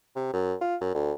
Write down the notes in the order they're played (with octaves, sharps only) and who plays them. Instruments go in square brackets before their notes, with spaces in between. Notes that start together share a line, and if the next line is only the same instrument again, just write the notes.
[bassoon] C3
F#2
F4
F#2
D2